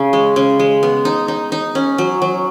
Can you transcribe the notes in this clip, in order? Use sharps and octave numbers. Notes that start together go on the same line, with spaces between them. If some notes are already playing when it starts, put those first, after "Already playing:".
Already playing: C#3
G#3
C#3
G#3
B3
D#4
D#4
D#4
C#4
F#3
F#3